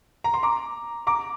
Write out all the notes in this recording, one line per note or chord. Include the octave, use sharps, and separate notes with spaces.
A#5
C6
A#5 D6
A#5 D6